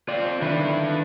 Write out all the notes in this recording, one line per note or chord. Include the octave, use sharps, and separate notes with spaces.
C4 F4 D5
D3 D#3 D4 E4 B4